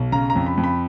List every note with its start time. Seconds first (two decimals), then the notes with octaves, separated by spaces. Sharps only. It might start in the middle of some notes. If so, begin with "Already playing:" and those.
Already playing: B1
0.12 C#3 A#5
0.30 A#5
0.35 F2
0.46 B5
0.57 F2
0.64 B5